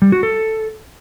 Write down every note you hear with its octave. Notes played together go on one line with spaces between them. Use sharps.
G3
F#4
A4